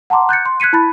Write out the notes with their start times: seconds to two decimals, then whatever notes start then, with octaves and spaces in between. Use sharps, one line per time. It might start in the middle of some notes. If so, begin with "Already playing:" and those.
0.10 F#5 A5 A#5 C6 D6
0.29 F#6 G6 A6 C#7
0.45 C6
0.60 F#6 G#6 B6 C#7 D#7
0.73 E4 A5 B5 A6